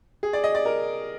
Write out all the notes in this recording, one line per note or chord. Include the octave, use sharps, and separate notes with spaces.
G#4
D5
D#5
D5
A#4